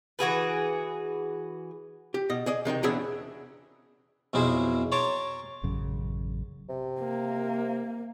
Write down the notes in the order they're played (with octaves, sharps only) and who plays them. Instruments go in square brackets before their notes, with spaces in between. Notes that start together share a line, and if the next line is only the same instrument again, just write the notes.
[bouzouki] E3 F#4 G#4 B4
[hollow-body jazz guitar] G4
B2 D#5
G#4 D5 D#5
C3 D#3 D#4 G5
E2 B2 C#4 D4 G#4 E5
[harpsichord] B1 F2 B2 E4 G#4 C5
C#5 A5 A#5 C6 D6
[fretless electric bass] A1 F#2 C#3
[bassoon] C3
[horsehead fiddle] A#3